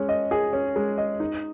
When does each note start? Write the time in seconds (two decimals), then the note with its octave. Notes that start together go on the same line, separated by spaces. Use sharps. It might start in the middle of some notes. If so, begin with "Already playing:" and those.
Already playing: G#3 C#4
0.09 D#5
0.31 G#4
0.53 C#4
0.76 G#3
0.98 D#5
1.20 D#4